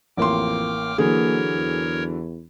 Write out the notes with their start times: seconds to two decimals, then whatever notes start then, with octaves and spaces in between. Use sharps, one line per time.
0.17 A1 F2 A#3 G5 C6 D6 F6
0.98 D3 E3 F#3 A#3 G#4 A#4 C#5
1.55 E2